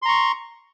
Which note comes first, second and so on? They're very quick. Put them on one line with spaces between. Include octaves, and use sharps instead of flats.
C6 A#5 C#6